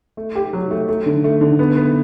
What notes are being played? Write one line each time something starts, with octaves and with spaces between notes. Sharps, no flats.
A3
G4
F#3
A3
A3
D3
A3
D3
B3
B3